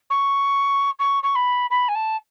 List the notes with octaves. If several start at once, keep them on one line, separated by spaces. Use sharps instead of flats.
C#6
C#6
C#6
B5
B5
G#5
A5